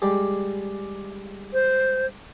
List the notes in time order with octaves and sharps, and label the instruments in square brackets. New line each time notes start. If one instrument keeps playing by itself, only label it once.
[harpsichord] G3 G#3 G4
[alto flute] C5